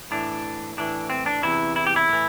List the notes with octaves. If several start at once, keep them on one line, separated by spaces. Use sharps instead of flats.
A2 E3 D4
A2 E3 D4
C4
D4
E2 C3 E3 E4
E4
G4
E4
A2 E3